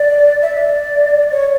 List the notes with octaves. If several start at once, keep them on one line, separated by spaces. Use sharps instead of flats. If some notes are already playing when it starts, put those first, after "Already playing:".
Already playing: D5
E5
D5
C#5